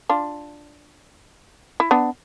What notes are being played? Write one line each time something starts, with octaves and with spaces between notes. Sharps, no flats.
D4 F4
E4
B3 D4